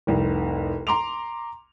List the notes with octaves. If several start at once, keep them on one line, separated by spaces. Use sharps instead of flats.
F1 C2
A#5 C6 D6 F7